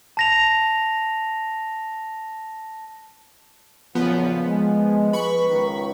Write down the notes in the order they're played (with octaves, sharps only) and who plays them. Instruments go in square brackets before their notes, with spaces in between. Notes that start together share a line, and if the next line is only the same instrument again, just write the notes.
[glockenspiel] A5 A#6 F7
[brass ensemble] B1 A#2 C#3 [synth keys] F3 B3
[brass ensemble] G#3
[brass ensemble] B4 [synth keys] B5 C#6
[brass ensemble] C#2 D#3